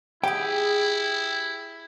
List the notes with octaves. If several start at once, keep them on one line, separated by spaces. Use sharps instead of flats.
E4 G4 G#4 G5